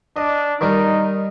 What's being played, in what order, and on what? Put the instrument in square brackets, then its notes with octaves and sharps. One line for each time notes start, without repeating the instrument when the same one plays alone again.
[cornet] D4 [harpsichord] D#5
[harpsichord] D#3 G3 A#4 [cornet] D#4